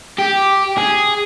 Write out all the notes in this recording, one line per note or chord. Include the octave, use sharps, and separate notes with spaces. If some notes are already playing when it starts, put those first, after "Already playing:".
G4
G#4